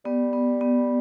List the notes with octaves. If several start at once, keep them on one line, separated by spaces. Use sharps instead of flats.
G3 B3
B3
B3